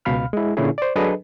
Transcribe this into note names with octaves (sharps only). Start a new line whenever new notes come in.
C#2 B2 F5 B5 F6
G#3 E4
A#2 D3 C#4 E4 G#4
C5 D5
F#3 D4 G#4 A4 B4 D#5